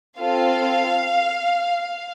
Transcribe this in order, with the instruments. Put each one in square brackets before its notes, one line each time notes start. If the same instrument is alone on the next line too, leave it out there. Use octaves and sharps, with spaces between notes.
[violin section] C4 F4 A4 F5